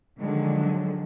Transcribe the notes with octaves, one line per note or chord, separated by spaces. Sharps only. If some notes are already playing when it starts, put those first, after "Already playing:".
D3 D#3 F3 F#3 G#3